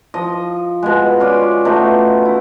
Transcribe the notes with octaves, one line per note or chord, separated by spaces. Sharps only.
F3 D#5
B2 G#3
C#4 F4 D5
B2 A3 D#4
E4